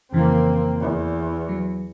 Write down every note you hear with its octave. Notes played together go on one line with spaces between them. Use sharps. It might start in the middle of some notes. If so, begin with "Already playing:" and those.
F2 C#3 E3 A#3 C4
E2
F#3